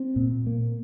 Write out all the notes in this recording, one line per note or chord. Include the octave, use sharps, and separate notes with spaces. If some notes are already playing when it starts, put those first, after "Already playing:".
Already playing: C4
A#2
A#3